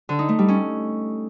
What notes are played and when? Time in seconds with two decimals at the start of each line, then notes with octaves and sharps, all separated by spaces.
0.09 D3
0.19 D#4
0.29 A3
0.39 G3
0.48 C#4